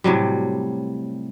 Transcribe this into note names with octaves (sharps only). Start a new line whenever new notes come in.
A2 C3 F#3 G3